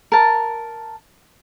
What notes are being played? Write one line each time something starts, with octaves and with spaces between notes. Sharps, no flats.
A#4 A5